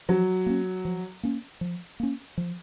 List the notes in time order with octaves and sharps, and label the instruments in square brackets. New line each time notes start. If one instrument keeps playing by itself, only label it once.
[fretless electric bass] F3 [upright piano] F#3
[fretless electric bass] A#3 C#4
F3
A#3 C#4
F3
A#3 C#4
F3